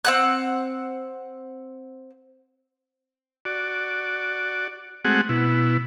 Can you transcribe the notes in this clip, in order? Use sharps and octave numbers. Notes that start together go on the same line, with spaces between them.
C4 F#5 F#6
F#4 D5
G#3 A3 C4 F#4 G#4 F#5
B2 E4